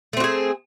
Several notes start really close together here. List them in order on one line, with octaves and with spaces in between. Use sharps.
A3 C4 F#4 G#4